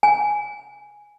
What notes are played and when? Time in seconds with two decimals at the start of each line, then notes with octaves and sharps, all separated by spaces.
0.03 G#5